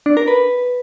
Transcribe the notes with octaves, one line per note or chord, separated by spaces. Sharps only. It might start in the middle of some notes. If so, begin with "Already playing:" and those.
D4
A#4
B4